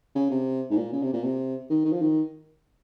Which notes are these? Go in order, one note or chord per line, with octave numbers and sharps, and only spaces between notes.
C#3
C3
G#2
A#2
C#3
C3
A#2
C3
D#3
D#3
F3
D#3